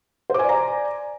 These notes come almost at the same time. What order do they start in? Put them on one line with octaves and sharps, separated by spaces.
C5 D6 G#5 D5 A#5